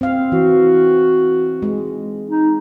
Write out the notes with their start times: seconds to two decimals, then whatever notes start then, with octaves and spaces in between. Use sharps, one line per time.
0.01 C4 F5
0.32 E3 F#4
1.62 G#3
2.28 D#4